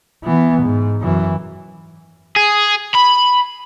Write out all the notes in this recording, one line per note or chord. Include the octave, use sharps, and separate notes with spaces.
E3 B3
G#2
F#2 E3
G#4
B5